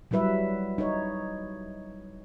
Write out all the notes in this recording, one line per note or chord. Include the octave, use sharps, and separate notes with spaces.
F#3 G3 E4 B4 E5
D#4 C#5